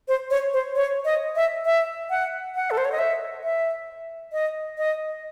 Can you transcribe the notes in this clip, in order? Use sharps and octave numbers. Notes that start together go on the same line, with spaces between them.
C5
C#5
C5
C#5
D#5
E5
E5
F#5
F#5
A4
C5
C#5
D#5
E5
E5
D#5
D#5